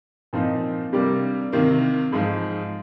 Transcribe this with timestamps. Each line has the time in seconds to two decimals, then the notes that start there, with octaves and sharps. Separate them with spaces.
0.33 A#2 F3 C4 D#4
0.93 C3 G3 A#3 D4
1.52 C3 D#3 A#3
2.12 G#2 F3 G#3